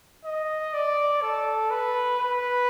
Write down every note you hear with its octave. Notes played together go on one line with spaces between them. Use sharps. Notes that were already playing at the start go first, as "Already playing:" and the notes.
D#5
D5
A4
B4
B4